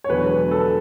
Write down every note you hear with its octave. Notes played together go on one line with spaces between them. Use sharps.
C#5
E1 E2 D3 F#3 B4
A4